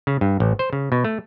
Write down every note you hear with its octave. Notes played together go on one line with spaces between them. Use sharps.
C#3
G2
A1
C5
C#3
B2
A3